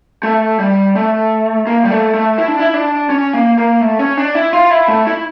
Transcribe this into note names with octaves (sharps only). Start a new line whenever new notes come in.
A3
G3
A3
A#3
G3
A3
A3
E4
D4
E4
D4
C#4
A#3
A#3
A3
C#4
D4
E4
F4
E4
A3
E4